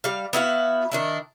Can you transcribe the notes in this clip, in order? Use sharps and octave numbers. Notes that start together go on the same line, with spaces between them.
G3 F5
B3 E4 F#4 F5
D#3 D4 E4